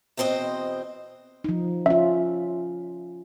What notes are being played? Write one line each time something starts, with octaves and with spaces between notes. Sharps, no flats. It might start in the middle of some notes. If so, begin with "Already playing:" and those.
E2 B2 C4 C5 D#5
F3 D#4
C#4 F4 E5